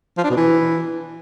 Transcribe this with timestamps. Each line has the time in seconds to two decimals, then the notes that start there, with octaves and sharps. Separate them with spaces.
0.18 F3
0.24 D4
0.30 B2
0.37 E3